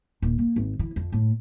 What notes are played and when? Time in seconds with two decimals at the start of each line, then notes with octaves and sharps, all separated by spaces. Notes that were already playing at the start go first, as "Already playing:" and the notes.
0.22 D#1
0.38 A#3
0.56 G#1
0.79 E3
0.96 F2
1.12 A2